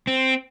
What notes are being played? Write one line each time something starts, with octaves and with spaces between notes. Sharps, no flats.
C4